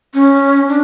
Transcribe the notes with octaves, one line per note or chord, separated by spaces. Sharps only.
C#4
D4